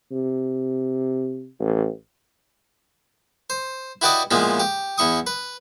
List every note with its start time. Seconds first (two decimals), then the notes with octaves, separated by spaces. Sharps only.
0.11 C3
1.59 A1
3.50 C5
4.02 E4 F#4 G4 B4 D5 D#5
4.31 A#2 F3 G#3 B3 E4
4.60 G4
4.98 E2 E4 C#6 D#6
5.27 B4